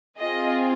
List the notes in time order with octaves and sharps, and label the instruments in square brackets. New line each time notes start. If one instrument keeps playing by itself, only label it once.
[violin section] C4 F4 G#4 D#5